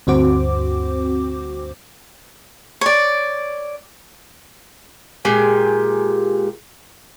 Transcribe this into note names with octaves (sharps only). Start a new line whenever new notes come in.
D2 G2 C4 F#4 C5 D6
C#5 D5
A#2 G#3 G4 G#5